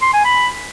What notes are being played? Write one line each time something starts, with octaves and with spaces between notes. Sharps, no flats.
C6
G#5
B5